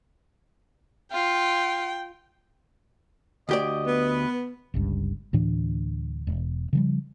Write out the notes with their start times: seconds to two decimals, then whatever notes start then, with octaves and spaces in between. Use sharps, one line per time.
1.12 F4 G5
3.49 D2 G4 D5 D#5
3.87 B3 B4
4.74 G1 C#2 G2
5.33 D2 A2 E3 D4
6.27 E1
6.73 C#3 F3 G3